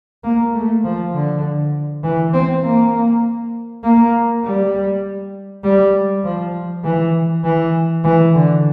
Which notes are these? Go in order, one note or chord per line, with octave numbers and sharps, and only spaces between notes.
A#3
A3
F3
D3
E3
C4
A#3
A#3
G3
G3
F3
E3
E3
E3
D3